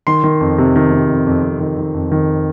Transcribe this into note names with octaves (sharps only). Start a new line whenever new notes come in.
D#3 C6
D#3
F2
C3
D#3
C3
F2
F2
F2
D#3
D#3
F2
D#3